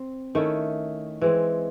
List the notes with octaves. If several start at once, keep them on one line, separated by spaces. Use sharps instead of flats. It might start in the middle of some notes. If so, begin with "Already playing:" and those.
Already playing: C4
D#3 A3 C#4 E4
E3 G#3 C4